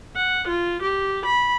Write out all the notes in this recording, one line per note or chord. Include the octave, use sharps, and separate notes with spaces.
F#5
F4
G4
B5